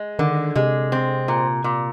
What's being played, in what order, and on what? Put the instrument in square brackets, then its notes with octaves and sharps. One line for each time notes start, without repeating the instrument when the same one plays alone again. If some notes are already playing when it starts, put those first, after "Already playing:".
Already playing: [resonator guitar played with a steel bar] G#3
[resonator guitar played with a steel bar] D3 [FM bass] D#3
[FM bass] C3 [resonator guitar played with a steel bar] G#3
[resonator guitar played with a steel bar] C4
A#2
A#2